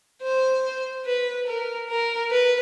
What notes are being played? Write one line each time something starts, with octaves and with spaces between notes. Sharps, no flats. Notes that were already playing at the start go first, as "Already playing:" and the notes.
C5
B4
A#4
A#4
B4